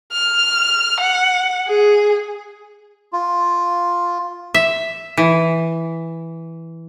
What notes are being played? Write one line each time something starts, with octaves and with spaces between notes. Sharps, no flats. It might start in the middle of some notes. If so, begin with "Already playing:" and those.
F6
F#5
G#4
F4
E5
E3